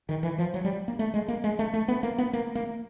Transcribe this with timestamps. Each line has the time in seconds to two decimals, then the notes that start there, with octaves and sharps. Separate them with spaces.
0.09 D#3
0.23 E3
0.38 F3
0.54 F#3
0.64 G3
0.88 A#3
0.99 A3
1.14 G#3
1.28 A#3
1.44 G#3
1.59 A3
1.74 A3
1.88 B3
2.03 A#3
2.18 B3
2.33 A#3
2.55 A#3